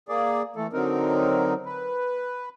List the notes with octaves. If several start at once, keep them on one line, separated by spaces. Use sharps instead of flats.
A#3 G#4 D5
E3 A3 A4
D3 F#3 C4 D#4 A#4
B4